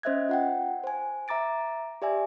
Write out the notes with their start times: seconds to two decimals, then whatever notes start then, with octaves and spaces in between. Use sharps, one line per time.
0.03 C#4 C5 D#5 E5 F#6 G#6
0.29 F4 F#5 G5
0.84 C5 G#5
1.28 E5 A#5 D6 A6 D7
2.02 G4 D5 E5 G#5